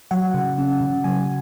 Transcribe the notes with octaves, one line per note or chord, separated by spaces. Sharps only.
F#3 F#5
C#3
C#4
C#3
F#3 G#5